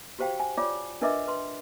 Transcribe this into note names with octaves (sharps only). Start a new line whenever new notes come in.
F#4 G4 C5 F5 G5
G#5
F4 C#5 D5 D6
D4 A#4 B4 D#5 E5 D6
B4 C6